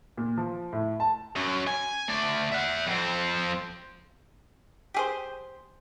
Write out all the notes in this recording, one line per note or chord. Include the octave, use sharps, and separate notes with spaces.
A#2
F3
A2
A5
F#2 F#3
G#5
A3 D5
E5 F#5
F2 C4
G4 G#4 C5